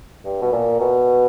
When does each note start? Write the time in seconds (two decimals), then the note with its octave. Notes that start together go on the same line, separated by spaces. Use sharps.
0.25 G2
0.42 B2
0.52 A#2
0.80 B2